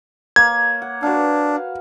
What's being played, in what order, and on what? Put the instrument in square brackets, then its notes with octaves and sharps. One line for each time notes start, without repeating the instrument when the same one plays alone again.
[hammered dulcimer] A#3 C#5 [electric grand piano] G#6
[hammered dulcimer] F#5
[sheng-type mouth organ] D4 [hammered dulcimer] F#4 B4 F5